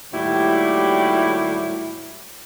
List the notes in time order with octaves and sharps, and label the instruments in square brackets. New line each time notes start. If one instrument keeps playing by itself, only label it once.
[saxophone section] D#2 A2 F#3 G3 E4 G4